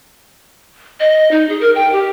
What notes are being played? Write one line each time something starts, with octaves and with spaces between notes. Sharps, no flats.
D#5
D#4
G#4
A#4
G5
G4